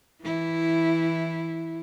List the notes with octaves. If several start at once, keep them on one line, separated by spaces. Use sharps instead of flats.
E3 E4